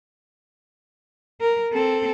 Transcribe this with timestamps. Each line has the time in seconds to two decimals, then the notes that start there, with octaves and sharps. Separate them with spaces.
1.41 A#4
1.72 C4 A4